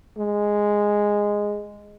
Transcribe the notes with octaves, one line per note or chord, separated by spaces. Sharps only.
G#3